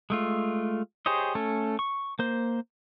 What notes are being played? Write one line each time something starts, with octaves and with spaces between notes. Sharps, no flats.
G#3 A3 F4
G4 G#4 C5 C#5 D#5
A3 C#4 A4
C#6
A#3 C5